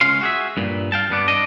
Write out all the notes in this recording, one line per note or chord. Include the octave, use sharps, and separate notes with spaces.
C#2 C#4 F5 C6
F#4 G#4 E5
G2 A#2
F5 G5 A5
G2 B3 D4
D4 D#5